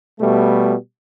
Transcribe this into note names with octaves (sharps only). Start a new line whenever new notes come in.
B2 G3 A3